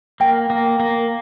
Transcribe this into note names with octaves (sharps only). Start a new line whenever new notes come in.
A#3 G5
A#3
A#3